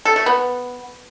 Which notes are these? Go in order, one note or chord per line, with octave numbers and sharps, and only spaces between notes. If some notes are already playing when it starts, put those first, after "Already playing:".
A4
A3
B3